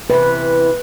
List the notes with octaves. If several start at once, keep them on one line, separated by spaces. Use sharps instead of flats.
C3 E3 B4